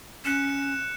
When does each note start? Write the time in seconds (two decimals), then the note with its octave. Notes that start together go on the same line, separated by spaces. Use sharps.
0.25 C#4 F#6 C#7 E7